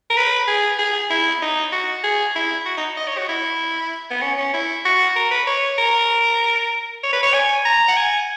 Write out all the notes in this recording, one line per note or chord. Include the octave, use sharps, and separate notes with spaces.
A#4
B4
G#4
G#4
E4
D#4
F#4
G#4
E4
F#4
D#4
D#5
C#5
F#4
E4
B3
C#4
C#4
E4
F#4
A#4
B4
C#5
A#4
C#5
B4
C#5
G#5
A#5
F#5
G#5